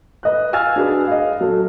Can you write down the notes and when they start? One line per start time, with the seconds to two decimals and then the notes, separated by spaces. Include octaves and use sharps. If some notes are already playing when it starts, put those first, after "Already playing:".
0.23 B4 D#5 F#6
0.53 F5 G#5 E6 F6 G#6 A6
0.76 D4 F#4 G#4 B4
1.07 D#5 F5
1.41 F#3 A4